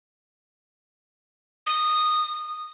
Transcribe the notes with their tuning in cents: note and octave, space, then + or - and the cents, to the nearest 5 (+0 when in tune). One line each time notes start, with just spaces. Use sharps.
D#6 -15